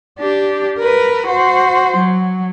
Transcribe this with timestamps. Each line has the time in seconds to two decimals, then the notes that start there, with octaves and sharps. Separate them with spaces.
0.19 D4 G4
0.79 A#4 B4
1.28 F#4 C5
1.97 F#3